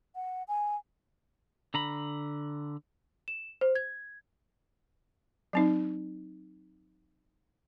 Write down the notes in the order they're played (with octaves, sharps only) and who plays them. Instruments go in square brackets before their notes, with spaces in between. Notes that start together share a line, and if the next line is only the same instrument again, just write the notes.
[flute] F#5
G#5
[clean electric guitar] D3 A#5 B5
[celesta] E7
C5
G#6
[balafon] F#3 C4 D#4